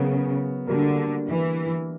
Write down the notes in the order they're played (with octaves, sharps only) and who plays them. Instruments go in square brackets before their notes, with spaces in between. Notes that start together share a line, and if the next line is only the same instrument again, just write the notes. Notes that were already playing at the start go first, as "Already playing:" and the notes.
Already playing: [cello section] C#3 [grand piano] F#3 B3 F#4 A#4
[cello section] D3 [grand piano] G3 A#3 D4 F#4 A#4
[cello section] E3